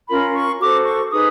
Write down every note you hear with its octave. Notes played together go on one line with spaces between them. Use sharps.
C#4 F4 A#4 B5
C#6
F#4 A4 C5 D6
C#6
D#4 G#4 B4 D#6